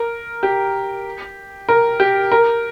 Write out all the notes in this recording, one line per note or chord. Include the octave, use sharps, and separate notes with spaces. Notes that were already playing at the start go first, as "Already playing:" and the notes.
Already playing: A#4
G4
A#4
G4
A#4